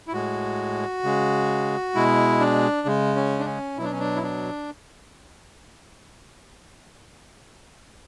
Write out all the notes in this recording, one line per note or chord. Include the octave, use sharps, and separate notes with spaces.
E4
A2 G#3 F#4
C#3 G#3
B2 G#3 E4
D4
C#3 G#3
C#4
D4
C#4
B2 F#3 D4 E4
C#4
D4
E4
D4